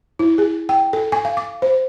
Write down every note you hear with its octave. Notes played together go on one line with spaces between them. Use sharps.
E4
G#4
G5
A4
G#5
F5
D6
C5